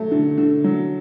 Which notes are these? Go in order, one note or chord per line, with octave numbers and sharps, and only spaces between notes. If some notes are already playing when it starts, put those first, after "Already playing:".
Already playing: F#3 A3
D3
D3
F#3